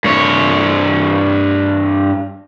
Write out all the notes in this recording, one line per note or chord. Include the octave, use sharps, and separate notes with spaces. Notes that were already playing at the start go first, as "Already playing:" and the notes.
G2 C#5